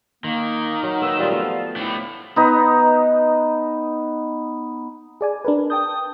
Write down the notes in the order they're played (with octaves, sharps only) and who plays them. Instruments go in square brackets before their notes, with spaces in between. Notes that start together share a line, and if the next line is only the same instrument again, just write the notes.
[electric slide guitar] D#3 [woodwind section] A#3
[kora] F#3
[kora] A#3 B4 [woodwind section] E6
[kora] G3 C4 [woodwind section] F4 F5
[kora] F3 A3 B3
[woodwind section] A2 [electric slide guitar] A3 D4
[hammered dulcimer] B3 D#4
[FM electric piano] G#4 D5 G#5
D4 A#4 B4
[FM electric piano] G5 A5 G6 [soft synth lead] D#6